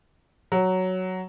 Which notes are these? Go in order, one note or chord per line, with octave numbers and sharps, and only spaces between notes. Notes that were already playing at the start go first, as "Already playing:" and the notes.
F#3